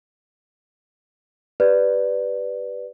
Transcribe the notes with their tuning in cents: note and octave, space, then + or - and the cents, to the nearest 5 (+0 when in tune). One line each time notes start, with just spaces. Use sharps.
G4 +0 B4 +0 D5 +0